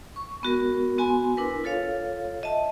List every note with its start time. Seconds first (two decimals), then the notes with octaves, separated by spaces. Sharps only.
0.16 C#6
0.42 G#3 B3 F#4 A#4
0.98 B3 F#4 G#5 C6
1.37 D4 E4 A#4 B4
1.64 F4 A4 C#5 F5
2.43 D#5 E5 A5